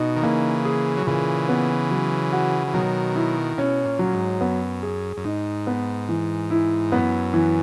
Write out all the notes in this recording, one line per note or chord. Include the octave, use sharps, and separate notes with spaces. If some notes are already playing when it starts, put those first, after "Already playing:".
Already playing: B2 D#4
D#3
C#3 E3 A#3
G#4
F#3
A#2 C#3 E3
B3
F#3
F#4
E3
B2 D#3 F#3
E4
B2 C#4
A#2
F#3
G#2
F#2 B3
G#4
F#2
G#2 D#4
B3
E3
E4
F#2 B3
E3